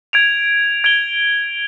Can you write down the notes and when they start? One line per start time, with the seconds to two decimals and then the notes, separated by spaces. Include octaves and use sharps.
0.13 G#6 D7 F7
0.84 G#6 D7 G7